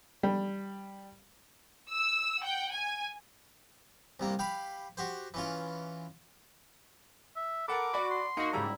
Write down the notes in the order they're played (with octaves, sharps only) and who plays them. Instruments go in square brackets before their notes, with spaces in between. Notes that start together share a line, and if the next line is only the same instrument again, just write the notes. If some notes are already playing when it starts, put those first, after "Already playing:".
[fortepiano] G3
[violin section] E6
F#5 G5
G#5
[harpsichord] C2 C3 A#3
G4 F5 B5
F#4 G4 C5
E3 C#4 F4
[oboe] E5
[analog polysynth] A4 [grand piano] A#4 F#5 B5 [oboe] D6
[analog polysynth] F#4 [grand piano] D5 B5
[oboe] C6
[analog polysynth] A#3 F#4 [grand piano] D#4 C#7
[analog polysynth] G#2 C#3 G3 [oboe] E4 [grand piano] A#5